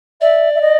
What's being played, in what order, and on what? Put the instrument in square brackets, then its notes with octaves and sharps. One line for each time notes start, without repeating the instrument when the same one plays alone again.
[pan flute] D5 [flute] E5
[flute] E5
D#5